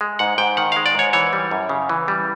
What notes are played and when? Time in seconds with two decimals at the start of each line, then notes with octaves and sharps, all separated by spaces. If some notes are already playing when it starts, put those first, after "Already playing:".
0.01 G#3
0.19 G#2 F#5
0.38 G#2 G5
0.57 D#3 F#5
0.72 G#3 F5
0.86 D5
0.95 G#2 C#5
1.13 E3 C#5
1.33 G3
1.51 F#2
1.69 C#3
1.89 E3
2.08 G3